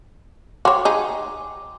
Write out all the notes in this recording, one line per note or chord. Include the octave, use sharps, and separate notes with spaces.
F#4 C#5 G5 C6 D6
D#4 G#4